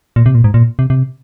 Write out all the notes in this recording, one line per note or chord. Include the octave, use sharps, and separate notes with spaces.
A#2
C3
A#2
G#2
A#2
C3
C3